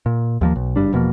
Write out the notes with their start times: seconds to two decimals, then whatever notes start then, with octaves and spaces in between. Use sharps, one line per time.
0.06 A#2
0.41 D#2 F3 A#3
0.56 B1
0.76 F#1 G2 G3 D4
0.92 E1 B2 F3 A#3